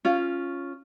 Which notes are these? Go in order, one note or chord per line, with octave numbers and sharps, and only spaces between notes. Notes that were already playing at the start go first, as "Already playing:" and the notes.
C#4 F4